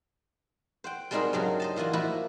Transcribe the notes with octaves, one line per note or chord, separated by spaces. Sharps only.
C5 F#5 G5
G3 G#3 C4 D#4 F#4 A#4
G2 C#3 F#3 G3
C5 D#5 A5
E3 A#3 F4 F#4 G#5
F3 A#3 E4 F#4 B4